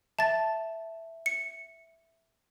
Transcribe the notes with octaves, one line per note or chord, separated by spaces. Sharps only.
E5 A5 A6
C#7